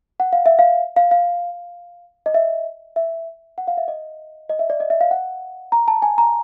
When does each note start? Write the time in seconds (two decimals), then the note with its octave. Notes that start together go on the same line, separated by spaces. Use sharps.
0.20 F#5
0.33 F5
0.46 E5
0.59 F5
0.96 F5
1.11 F5
2.26 D#5
2.34 E5
2.96 E5
3.58 F#5
3.67 F5
3.77 E5
3.88 D#5
4.49 D#5
4.59 E5
4.70 D5
4.80 D#5
4.90 E5
5.01 F5
5.11 F#5
5.72 A#5
5.88 A5
6.02 G#5
6.18 A#5